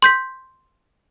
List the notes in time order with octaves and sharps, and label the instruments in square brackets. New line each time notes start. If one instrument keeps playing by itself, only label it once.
[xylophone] C6 G6 B6